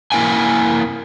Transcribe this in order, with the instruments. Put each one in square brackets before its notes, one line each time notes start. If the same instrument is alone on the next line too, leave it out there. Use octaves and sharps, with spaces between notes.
[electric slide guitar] A#3 E4 A#4 G5 G#5